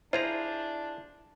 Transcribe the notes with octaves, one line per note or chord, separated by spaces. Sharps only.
D4 E4 F4 G#4 C5 A#5